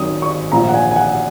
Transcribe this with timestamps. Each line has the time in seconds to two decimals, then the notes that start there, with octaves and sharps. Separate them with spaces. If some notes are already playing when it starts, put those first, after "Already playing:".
Already playing: G#1 F#2 D#3 D#6
0.22 C#6
0.52 A#1 A#2 A#5
0.69 F#5
0.74 G#5
0.91 G#5
0.96 F#5